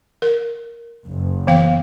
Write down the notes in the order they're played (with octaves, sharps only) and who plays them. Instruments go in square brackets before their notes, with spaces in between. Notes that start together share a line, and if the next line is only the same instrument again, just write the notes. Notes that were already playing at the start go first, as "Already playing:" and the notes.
[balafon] A#4
[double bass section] F#1
[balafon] E3 B3 F5